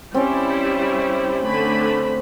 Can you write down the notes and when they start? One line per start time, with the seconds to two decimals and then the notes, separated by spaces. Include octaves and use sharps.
0.14 G3 C4 C#4 E4
1.44 D3 A3 B5